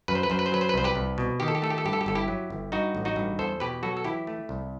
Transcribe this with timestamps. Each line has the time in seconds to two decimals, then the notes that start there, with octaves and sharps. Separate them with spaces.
0.08 F#2 B4
0.15 C5
0.23 B4
0.30 F#2 C5
0.39 B4
0.46 C5
0.52 F#3 B4
0.61 C5
0.69 B4
0.74 C2 C5
0.84 G4 B4
0.96 C2
1.18 B2
1.40 D#3 G4
1.48 A4
1.55 G4
1.62 A3 A4
1.70 G4
1.78 A4
1.85 G2 G4
1.93 A4
2.01 G4
2.06 G1 A4
2.15 E4 G4
2.28 F#3
2.50 G1
2.72 G2 D#4 F#4
2.95 A1
3.05 D#4 F#4
3.16 G2
3.39 E2 A4 C5
3.60 B2 G4 B4
3.83 F#3 F#4 A4
3.97 A4
4.04 E3 E4 G4
4.27 A3
4.49 C2